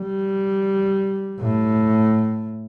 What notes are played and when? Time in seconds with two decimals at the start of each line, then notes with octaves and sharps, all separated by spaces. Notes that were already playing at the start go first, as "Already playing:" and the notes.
Already playing: G3
1.41 A2